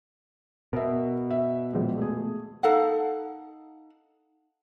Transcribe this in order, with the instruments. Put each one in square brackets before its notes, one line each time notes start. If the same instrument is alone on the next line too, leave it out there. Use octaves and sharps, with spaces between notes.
[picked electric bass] B2 [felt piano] A#4 E5
[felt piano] E5
A#1 A#2 G#3
A3 G#4
[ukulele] D#4 A4 F5 F#5